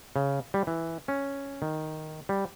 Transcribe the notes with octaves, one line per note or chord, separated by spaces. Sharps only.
C#3
G3
E3
C#4
D#3
G3